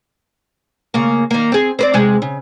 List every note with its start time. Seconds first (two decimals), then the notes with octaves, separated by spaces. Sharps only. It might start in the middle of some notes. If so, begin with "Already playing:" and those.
0.94 C#3 A#3
1.31 D#3 A#3
1.52 C4 G#4
1.79 C4 B4 D5
1.94 C3 G#3 G#4
2.22 C#3